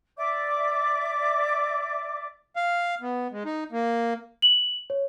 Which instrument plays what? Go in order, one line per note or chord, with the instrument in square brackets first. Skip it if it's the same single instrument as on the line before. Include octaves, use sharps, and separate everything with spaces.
[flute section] D5 E5 D6
[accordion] F5
B3
G#3
D#4
A#3
[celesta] F#7
C#5